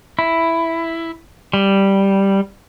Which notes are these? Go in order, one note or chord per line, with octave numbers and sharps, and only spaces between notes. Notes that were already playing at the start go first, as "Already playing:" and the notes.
E4
G3